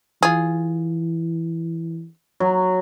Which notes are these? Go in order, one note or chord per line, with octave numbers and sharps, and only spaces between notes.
E3 F4 G#4
F#3